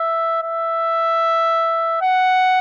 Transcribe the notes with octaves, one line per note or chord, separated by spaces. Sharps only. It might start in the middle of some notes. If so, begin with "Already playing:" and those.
Already playing: E5
E5
F#5